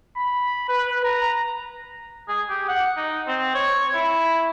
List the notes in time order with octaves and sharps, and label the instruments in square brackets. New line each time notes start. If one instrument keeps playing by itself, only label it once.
[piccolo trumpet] B5
B4
A#5
[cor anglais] G#4
G4
F#5
D#4
C4
C#5
E4